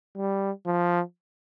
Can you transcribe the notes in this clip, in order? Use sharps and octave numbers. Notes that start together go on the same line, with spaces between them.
G3
F3